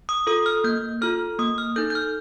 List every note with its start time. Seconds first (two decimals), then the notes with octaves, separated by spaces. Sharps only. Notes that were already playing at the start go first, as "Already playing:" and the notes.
0.09 D#6
0.27 F4 A4 D#6
0.46 F6
0.64 A#3 G6
1.01 F4 A4 F6
1.39 A#3 D#6
1.58 F6
1.76 D#4 A4 G6
1.90 G6
1.95 F6